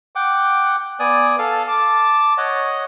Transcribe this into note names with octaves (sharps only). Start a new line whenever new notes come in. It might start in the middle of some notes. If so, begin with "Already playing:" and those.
F#5 G5 D6
B3 D5 G#5 D#6
A4 F5
A5 D6
C#5 D#5 F#5